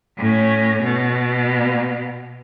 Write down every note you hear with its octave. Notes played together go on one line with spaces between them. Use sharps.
A2 C#4
B2